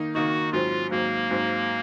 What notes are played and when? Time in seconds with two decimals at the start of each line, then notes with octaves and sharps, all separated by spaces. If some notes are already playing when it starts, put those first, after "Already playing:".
Already playing: D#3 A#3 D#4
0.15 D#3 A#3 D#4 F#4
0.52 G#2 F#3 C4 F4
0.91 G#2 F#3 A#3 C4
1.31 G#2 F#3 C4